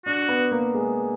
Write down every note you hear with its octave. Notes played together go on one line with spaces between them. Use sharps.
D4 F#4
B3
A#3
G#3